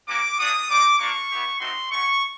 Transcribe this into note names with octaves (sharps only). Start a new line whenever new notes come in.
A#3 C#4 F#4 D6
A#3 D4 F#4 D#6
G3 A#3 D#4 D6
A#3 D4 F4 C#6
B3 E4 G4
A3 C4 D#4 F#4 C6
A3 C#4 F#4 C#6